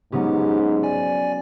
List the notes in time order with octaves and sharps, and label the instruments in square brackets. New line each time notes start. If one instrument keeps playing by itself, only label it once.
[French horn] G#2 [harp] F#3 B3 C#4 [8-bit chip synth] G4
[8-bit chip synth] D5 G#5